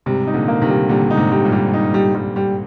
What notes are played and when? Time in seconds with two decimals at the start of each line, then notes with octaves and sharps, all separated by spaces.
0.06 G#2 C3 G3
0.27 D#4
0.34 A#2 D3
0.48 A#3
0.62 C3 D#3
0.68 G3
0.89 A#2 D3 G3
1.10 D#4
1.17 G#2 C3
1.32 G3
1.45 G2 A#2
1.52 G3
1.74 D#4
1.94 G3
2.15 G3
2.36 G3